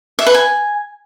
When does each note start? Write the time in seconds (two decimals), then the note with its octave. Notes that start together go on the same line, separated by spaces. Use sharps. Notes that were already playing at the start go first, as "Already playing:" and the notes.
0.19 E5
0.27 B4
0.34 G#5